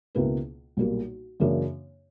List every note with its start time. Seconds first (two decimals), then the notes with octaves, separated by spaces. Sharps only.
0.15 C#2 B2 A#3 E4 B4
0.77 B1 A#2 G3 A#3
1.40 F#2 C#3 E3 A#3 D4